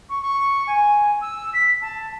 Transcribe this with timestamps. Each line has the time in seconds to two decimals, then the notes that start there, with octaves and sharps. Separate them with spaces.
0.09 C#6
0.22 C#6
0.67 G#5
1.21 E6
1.53 B6
1.81 A5